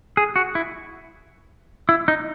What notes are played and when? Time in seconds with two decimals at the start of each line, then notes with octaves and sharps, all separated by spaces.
0.17 G#4
0.36 F#4
0.55 E4
1.89 E4
2.08 D#4